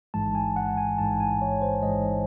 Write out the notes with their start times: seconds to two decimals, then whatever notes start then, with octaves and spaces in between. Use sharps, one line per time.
0.14 A1 G#2 E3 G#3 A5
0.35 G#5
0.56 F#5
0.78 G#5
0.98 A1 G#2 E3 G#3 A5
1.20 G#5
1.42 C#5
1.62 C5
1.83 A1 G#2 E3 G#3 D#5